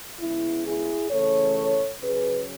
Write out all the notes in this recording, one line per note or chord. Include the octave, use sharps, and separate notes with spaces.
C#3 G#3 B3 E4
E4 G#4
C#3 E3 A3 C#4 A4 C#5
C#3 F#3 C#4 G#4 B4